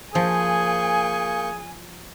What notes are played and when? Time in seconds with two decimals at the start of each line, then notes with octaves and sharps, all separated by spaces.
0.15 F3 A#3 G#4 G#5 C#6 G6